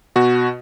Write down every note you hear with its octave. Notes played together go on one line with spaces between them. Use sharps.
B2 F#4